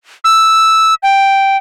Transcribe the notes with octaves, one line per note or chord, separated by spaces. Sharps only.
E6
G5